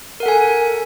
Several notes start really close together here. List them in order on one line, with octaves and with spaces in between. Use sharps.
A#4 F#5 A4 G#5